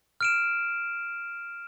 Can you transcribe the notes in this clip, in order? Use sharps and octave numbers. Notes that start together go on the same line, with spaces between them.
F6 D7 E7